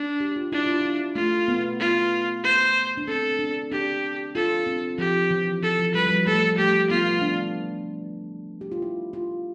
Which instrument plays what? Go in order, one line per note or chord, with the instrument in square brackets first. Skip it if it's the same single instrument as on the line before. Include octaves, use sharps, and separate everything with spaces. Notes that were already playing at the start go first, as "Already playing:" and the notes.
Already playing: [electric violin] D4
[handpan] G4
F4
[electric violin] D4 [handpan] E4
[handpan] F4
E4
[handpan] A3 [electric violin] F4
[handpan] B3
[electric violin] F4
C5
[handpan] D4
[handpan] C4 [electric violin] A4
[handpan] D4
[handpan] D4 [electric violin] G4
[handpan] F4 [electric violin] A4
[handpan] C4
[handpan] F3 [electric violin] G4
[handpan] E3
[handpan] F3 [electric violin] A4
[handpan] F3
[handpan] G3 [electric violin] B4
[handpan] F3
G3
[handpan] A3 [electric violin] A4
[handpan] A3 [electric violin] G4
[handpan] B3 [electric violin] F4
[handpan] D4
G4
F4
E4
F4